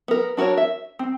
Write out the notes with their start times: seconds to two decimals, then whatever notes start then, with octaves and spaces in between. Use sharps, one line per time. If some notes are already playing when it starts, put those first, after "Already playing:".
0.08 B3 A#4
0.37 D4 F#4 A4 A#4 C#5
0.57 E5
0.99 C4